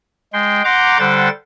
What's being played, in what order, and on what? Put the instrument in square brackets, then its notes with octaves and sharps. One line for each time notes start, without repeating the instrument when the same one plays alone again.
[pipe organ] G#3 G5 C6
F#5 A#5 C6 D6 G6
D3 G3 C5 F#5 G5 A6